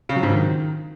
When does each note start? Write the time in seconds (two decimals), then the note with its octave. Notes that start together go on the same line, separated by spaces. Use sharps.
0.09 C#3
0.16 F#3
0.23 G#2
0.30 D#3